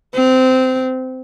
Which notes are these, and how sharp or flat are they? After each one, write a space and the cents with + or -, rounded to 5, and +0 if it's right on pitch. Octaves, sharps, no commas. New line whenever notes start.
C4 -20